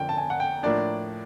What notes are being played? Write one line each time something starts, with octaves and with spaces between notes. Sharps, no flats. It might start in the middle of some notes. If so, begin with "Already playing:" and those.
Already playing: F2 D3 F3 A#3 C#4 G5
A5
G#5
F#5
G5
A2 F3 A#3 D4 D5